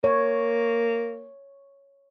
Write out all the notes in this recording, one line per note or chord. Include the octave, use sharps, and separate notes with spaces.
A#3 C#5